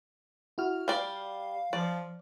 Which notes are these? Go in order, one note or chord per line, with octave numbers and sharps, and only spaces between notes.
E4 F#4 F6
G3 D5 F5
F3 D5